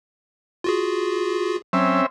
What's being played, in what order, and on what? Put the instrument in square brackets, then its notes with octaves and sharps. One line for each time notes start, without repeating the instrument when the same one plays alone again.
[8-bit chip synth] F4 F#4 G#4
[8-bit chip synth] F#3 [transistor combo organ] C4 C#4 E5